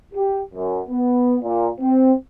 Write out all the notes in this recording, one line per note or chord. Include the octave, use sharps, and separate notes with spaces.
G4
F#2
B3
A#2
C4